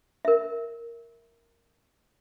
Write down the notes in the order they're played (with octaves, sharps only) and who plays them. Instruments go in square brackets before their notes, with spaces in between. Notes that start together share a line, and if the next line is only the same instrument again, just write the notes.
[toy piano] A#4 E5